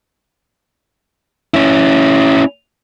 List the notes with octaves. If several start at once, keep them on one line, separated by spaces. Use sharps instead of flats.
C#4 E4